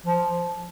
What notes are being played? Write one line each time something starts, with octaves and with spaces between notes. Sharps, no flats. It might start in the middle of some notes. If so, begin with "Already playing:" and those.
F3